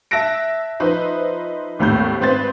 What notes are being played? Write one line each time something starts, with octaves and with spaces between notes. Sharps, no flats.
E5 A5 F#6 A#6 D7
F3 D#4 B4 C5 D#5 E5
G#1 D#2 A2 B5 G6
G#1 C4 B4 C5 A6